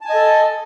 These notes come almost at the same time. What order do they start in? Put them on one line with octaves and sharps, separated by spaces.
A5 G#5 D#5 A4